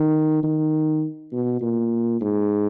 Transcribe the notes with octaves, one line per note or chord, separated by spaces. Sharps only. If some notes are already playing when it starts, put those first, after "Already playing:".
Already playing: D#3
D#3
B2
A#2
G#2